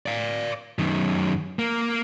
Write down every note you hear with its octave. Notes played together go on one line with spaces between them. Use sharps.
D5 F5
F#2 D#3
A#3